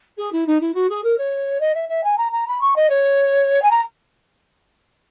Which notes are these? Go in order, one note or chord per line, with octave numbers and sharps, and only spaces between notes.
G#4
E4
D#4
E4
F#4
G#4
A#4
C#5
D#5
E5
E5
G#5
A#5
A#5
B5
C#6
D#5
C#5
G#5
A#5